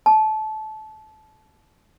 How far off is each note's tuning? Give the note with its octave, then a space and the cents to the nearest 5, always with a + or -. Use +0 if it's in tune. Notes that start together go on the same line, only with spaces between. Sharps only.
A5 -25